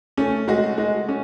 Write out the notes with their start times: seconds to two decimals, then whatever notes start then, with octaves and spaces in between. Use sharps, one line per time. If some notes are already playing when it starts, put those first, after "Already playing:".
0.17 A3 C#4
0.48 G#3 F#4
0.78 G#3
1.09 C#4